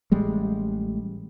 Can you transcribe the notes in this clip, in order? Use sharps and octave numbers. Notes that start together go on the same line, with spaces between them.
A1 G3 G#3